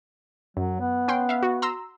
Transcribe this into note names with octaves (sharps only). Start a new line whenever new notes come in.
F#2 F#3
B3
C#4 G5 C6
E5 F5
F#4
A#5 C6 E6